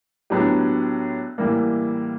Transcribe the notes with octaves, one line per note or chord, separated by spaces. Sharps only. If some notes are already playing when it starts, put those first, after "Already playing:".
A2 F#3 B3 D4 G4
A2 E3 G3 A#3